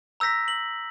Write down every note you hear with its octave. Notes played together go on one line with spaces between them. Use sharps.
A#5 E6 G6 A#6 B6
F#7